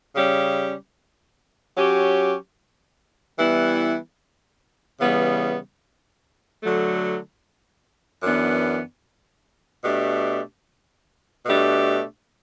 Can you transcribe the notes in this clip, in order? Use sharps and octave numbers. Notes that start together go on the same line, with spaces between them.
C#3 G3 C#4 G4
F#3 C#4 G4
E3 G3 B3 E4
C#3 E3 G3 B3
D3 F#3 A3
F#2 E3 B3 D4
B2 A3 D4 G4
B2 A3 D4 G4